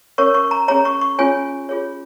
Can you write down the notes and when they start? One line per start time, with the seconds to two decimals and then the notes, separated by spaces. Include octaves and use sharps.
0.18 C#4 A#4 C#5 C#6
0.34 C#6
0.51 A#5
0.68 C#4 G#4 C#5 A#5
0.85 C#6
1.01 C#6
1.18 C#4 F4 G#4 C#5 G#5
1.69 F4 G#4 C#5